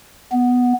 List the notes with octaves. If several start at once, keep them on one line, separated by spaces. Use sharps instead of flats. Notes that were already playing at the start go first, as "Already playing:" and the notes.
B3